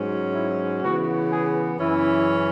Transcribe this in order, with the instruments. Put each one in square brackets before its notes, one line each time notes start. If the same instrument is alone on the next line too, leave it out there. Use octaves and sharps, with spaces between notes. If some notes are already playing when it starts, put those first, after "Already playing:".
Already playing: [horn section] G#2 F#3 C#4
E4
C#3 E3 B3 F#4
G#4
F#2 C#3 E3 C#4 E4